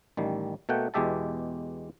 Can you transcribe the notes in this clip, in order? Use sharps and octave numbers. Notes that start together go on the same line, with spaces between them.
A1 D#3 G3
B2 A3 A#3 F#5 G5
E2 B2 G#3 G4 E5 A5